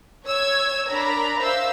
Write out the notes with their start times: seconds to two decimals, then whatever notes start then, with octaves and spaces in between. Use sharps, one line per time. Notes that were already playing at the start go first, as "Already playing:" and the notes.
0.25 C#5 E6 G#6
0.89 D4 A#4 A#5 B5
1.40 C5 E5 F5 E6